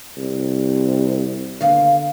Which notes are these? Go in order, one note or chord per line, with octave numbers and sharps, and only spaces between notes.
C2
D#2 D3 B3 F5